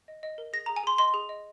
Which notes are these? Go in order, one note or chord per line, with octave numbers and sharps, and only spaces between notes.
D#5
D#5
A#4
G#4 A#6
G#4 A#5
G#5
G#4 C6
D#5 C6
G#4
D#5